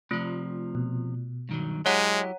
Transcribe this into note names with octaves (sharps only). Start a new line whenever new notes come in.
C3 F3 A3 F4
B2
G2 D#3 F#3
F#3 G#3 E4 G4 C#5 F#5 A#5